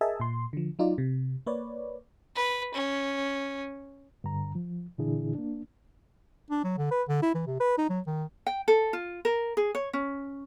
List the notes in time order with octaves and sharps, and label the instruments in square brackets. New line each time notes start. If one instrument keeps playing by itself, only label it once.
[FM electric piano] G#4 A#4 D#5 E5 G#5 A5
A#2 C6
D3 F3
F#3 D#4 F4 D5
C3
A#3 B4 C#5 D5
[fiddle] B4
C#4
[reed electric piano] G2 D3 A#5
F3
A#2 D3 E3 D4 E4 G#4
A#3 D4
[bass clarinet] D4
F#3
D3
B4
D3
E4
E3
C3
B4
D#4
F#3
D#3
[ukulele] G5
A4
F4
A#4
G#4
C#5
C#4